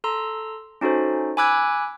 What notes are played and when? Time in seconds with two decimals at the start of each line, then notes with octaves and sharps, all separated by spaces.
0.04 A4 A#5 C6 E6
0.81 C#4 D#4 F#4 A4 C5
1.37 G#5 B5 D6 E6 F#6 G#6